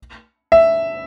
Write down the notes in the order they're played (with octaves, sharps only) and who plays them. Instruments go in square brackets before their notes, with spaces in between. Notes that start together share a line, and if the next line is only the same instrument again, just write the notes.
[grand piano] E5